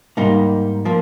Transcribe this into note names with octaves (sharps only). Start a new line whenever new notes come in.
G#2 G3 A#3 D#4
F3 A#3